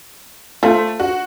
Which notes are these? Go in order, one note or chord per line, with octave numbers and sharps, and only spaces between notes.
A3 F4 A4 C5
F#4